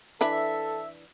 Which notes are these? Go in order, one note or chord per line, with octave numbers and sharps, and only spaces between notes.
E3 D4 A4 B4 E5